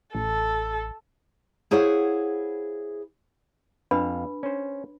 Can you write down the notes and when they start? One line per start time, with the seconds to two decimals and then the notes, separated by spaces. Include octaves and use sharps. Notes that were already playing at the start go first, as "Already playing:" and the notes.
0.15 A1 A4
1.71 E4 G#4 C5 C#5 F5 F#5
3.91 F2 D4 B4 F5 B5
4.43 C#4 C5